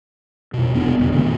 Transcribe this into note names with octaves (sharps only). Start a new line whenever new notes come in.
F2 B2
F1 B3 D4
A1 F2 C#3
A#2 D#3 A3